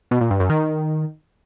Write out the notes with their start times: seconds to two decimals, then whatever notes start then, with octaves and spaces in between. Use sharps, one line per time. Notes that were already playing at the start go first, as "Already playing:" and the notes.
0.11 B2
0.21 A#2
0.30 G2
0.40 F#2
0.50 D#3